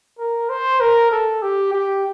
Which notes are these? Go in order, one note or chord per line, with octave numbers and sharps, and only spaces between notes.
A#4
C5
A#4
A4
G4
G4